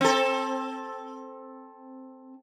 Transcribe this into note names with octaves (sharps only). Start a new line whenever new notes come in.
C4 A4